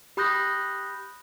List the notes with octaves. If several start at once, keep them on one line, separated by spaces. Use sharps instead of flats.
G4 B5 D#6 F#6 G6 A#6